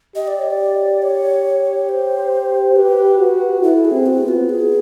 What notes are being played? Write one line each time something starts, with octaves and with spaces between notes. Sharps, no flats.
G4 D#5
D5
C#5
D5
C#5
C5
G4 B4
F#4
E4 A4
G#4
C4
F#4
B3
F4
G#4